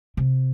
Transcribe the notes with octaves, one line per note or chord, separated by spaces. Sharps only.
C3